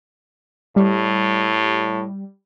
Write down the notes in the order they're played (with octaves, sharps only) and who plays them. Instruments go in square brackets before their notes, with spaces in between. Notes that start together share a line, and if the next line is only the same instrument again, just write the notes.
[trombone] A2 [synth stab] G3